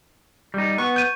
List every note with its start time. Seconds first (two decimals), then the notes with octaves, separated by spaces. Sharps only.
0.54 G3 D#4
0.78 B3 C#6
0.96 G6 D#7